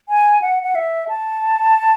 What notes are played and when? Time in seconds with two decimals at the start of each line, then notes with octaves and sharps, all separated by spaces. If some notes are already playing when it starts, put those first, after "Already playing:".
0.09 G#5
0.42 F#5
0.63 F#5
0.75 E5
1.09 A5